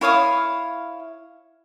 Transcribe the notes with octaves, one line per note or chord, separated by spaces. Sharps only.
E4 C#5 F5 D#6